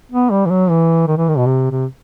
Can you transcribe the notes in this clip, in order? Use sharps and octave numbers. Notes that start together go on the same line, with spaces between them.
B3
G3
E3
F#3
E3
D#3
E3
D#3
B2
C3
C3